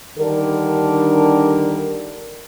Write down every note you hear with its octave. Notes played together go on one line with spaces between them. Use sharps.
D3 D#3 G3 D4 A#4